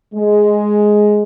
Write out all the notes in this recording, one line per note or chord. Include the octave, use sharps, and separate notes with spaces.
G#3